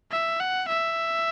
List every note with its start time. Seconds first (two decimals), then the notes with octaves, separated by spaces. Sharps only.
0.11 E5
0.40 F#5
0.69 E5